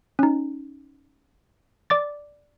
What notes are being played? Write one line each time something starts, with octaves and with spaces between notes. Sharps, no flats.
C#4 D#4
D5 D6 A6